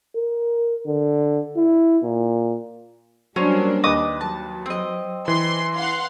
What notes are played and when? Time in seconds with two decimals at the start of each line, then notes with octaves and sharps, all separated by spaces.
0.16 A#4
0.87 D3
1.57 E4
2.03 A#2
3.36 F#3 G3 A#3 C#4 D4 C5 C#5
3.84 D#2 B4 D#5 D6 D#6 A#6
4.21 F#3 A5
4.66 C4 D#5
5.28 E3 C6
5.77 F5 F#5 C6